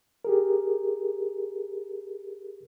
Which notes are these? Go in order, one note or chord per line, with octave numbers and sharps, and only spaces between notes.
G4 G#4 A#4